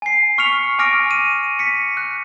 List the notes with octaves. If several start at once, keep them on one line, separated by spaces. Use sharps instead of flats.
G#5 C7
C#6 F6 B6 C#7 F7
G#5 D6 F6 A#6 D7
D#7
B6 C#7
F#6